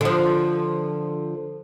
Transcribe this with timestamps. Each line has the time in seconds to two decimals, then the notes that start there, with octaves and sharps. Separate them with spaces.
0.01 D3 F3